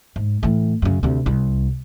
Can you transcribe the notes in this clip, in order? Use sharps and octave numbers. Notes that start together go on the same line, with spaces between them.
G#2
A2 E3
F#2 C#3
D2 C3
C2